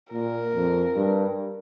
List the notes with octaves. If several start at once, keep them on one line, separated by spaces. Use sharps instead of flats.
A#2 A#4
F2
G2